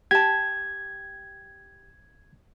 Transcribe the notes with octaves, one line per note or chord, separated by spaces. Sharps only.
G4 A5 G#6